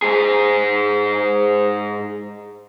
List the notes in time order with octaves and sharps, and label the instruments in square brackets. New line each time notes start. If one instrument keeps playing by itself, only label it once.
[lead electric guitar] G#2 G#4